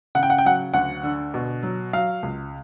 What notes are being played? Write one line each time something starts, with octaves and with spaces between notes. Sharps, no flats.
C#3 F#5
G5
F#5
G5
F#3 F#5
D2 F#5
D3
B2
F#3
F#3 F5
C#2